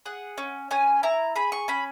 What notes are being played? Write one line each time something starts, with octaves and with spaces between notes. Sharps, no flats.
G#4 F#5
C#4
C#4 G#5
E4 A#5
G#4 B5
C#6
C#4 B5